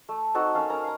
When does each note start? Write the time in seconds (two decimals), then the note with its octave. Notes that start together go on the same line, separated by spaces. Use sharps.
0.09 A3
0.34 C4 D#4 F#4 A4
0.55 A#3 C#4 A4 F5
0.70 C#4 A#4 A#5
0.84 F5 A#5